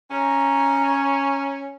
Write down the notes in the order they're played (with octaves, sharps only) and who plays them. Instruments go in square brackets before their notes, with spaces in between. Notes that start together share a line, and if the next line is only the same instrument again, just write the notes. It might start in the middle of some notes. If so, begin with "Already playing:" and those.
[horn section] C#4 [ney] A#5